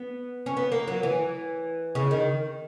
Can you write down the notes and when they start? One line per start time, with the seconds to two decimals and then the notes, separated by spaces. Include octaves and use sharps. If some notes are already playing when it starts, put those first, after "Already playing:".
Already playing: B3
0.46 C#4
0.57 B3
0.72 A#3
0.88 F#3
1.03 E3
1.95 C#3
2.11 D#3